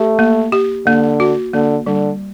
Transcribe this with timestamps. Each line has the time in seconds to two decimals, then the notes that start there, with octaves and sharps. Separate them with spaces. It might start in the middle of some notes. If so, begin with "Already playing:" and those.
Already playing: A3 G4
0.19 A#3
0.52 G4
0.86 D3 A#3
1.20 F#4
1.53 D3 A#3
1.86 D3 G3